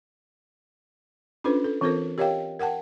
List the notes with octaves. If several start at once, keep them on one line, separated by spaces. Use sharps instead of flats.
C#4 D4 F4 A4 B4 C5
A4
E3 C4 F4 A4 A#4 C5
G4 A#4 C#5 D#5 F5 G5
A#4 F#5 G5 A5